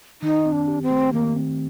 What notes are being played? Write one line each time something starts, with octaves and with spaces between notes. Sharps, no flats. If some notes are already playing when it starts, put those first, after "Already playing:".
D#3 D#4
C4
D4
G4
C4
A3
D#3 A#3
C4